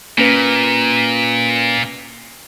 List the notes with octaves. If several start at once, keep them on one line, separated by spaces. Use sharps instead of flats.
A#2 A#3 C#4 B4